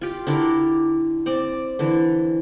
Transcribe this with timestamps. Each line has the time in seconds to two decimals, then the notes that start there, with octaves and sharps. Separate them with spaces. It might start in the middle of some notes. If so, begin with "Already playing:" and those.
0.01 F4 G4
0.27 D3 D4 E4 A#4
1.26 C4 D5 D6
1.79 D3 E3